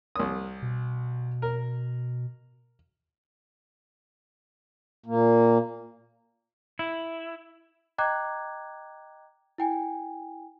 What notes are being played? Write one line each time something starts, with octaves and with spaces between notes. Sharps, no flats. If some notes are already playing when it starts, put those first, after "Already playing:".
C2 D#6
B2
A#4
A#2 A#3
E4
D#5 G5 A#5 D6 F#6 G#6
E4 G5 G#5